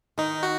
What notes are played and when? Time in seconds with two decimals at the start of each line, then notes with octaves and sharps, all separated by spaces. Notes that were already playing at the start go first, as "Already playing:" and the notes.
0.18 D#3 D#4
0.43 F#4